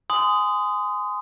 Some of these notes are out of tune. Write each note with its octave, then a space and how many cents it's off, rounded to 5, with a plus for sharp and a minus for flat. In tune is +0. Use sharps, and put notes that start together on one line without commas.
G#5 +0 C6 -30 D#6 +0